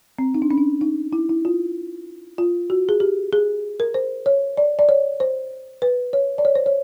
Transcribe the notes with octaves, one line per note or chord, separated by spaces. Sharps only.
C4
D#4
D4
C#4
D4
D#4
E4
E4
F4
F4
F#4
G#4
G4
G#4
A#4
C5
C#5
D5
D5
C#5
C5
B4
C#5
D5
C#5
C5
C#5